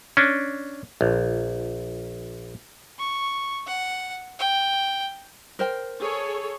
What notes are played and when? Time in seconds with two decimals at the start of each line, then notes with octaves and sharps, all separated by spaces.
0.17 C#4 D4
1.01 A#1
2.99 C#6
3.67 F#5
4.39 G5
5.59 A#4 C5 G5
6.00 G#4 A4 C#5